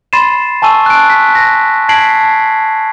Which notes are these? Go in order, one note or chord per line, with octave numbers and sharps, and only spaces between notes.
B5 C6 A6 C7 D#7 E7
G#5 A5 C#6 E6 D#7
F#6 D7
B6
A#6
A5 G#6 B6 C7 D7 F#7